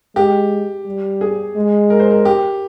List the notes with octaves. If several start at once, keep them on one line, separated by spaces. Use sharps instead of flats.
G#3 G4
G3
G#4
G#3
A#4
C5
A#4
G4